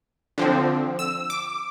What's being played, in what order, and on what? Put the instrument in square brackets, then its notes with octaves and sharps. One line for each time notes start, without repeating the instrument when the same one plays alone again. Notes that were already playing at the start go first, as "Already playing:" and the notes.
[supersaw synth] D3 F3 C4
E6
D6